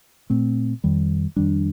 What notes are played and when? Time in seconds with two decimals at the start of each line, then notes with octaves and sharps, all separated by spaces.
0.30 A#2 A3 C4
0.84 F2 D#3 G3
1.36 F2 D#3 G3 D4